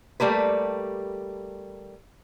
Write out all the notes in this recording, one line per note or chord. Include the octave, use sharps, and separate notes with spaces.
G3 A3 A#3 B4